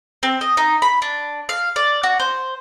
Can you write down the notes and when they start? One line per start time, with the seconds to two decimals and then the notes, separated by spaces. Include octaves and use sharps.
0.23 C4
0.41 D#5
0.57 D#4
0.82 B5
1.02 D4
1.49 F5
1.76 D5
2.03 F#4
2.20 C5